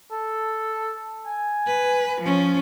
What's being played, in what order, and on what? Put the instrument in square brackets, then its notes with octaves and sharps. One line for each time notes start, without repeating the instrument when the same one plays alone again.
[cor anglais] A4
G#5
[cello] B4
F3 C#4